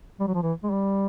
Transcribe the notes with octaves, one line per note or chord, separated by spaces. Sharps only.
G3
F#3
F3
E3
G#3
G3